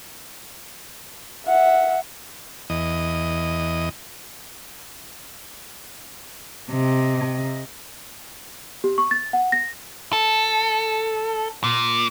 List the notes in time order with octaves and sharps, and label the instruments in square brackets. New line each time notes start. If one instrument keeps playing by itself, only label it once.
[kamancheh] E5 F#5
[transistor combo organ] E2 D#5
[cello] C3 D#5
[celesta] G4
C#6
A6
F#5
A#6
[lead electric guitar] A4
A#2